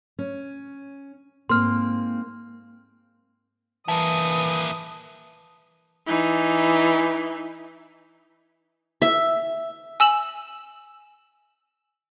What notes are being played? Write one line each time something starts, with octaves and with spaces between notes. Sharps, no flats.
C#4
G#2 A#3 C4 C6 F6
E3 A#3 E4 A5 D#6
E3 D#4
E5
G#5 E6 E7 F#7